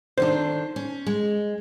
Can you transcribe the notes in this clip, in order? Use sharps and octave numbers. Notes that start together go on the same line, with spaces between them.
D3 D#3 D4 C5
C#4
G#3